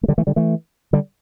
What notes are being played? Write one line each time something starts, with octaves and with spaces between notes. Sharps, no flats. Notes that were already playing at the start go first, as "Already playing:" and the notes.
A3
D3 G3
E3 A3
D3 G3
E3 A3
D3 G3